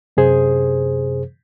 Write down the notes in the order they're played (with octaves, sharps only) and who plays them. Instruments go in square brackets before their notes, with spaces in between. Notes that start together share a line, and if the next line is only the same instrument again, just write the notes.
[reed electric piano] F#2 C3 G#4 C5